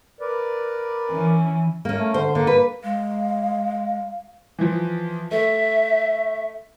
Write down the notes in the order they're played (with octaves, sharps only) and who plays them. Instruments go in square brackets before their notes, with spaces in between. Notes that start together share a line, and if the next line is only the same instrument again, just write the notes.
[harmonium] A#4 B4 D5
[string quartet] E3 C#4
[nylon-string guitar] A#3 C#4
[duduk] A3
[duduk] D3 [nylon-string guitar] C5
[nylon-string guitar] D3 [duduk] A#3
[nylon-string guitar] B4
[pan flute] G#3 [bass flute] F5
[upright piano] E3 F3
[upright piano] A3 [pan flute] E5